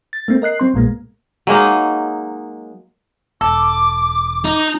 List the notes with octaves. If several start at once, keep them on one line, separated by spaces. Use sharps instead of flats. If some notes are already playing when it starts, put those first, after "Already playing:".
A6
A3 A#3 C4
A#4 D#5 F#6 C7
F#3 C4 C6
B1 A#2 G#3 A#3
F#3 G#3 A#3 D#4
E1 A4 D6
D#4